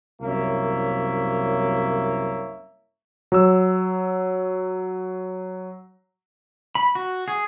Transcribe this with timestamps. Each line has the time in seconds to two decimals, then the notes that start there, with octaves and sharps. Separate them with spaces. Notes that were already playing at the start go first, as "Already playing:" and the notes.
0.21 C2 F#2 A#3 C#5 E5
3.32 F#3 E6
6.75 B5
6.95 F#4
7.28 G#4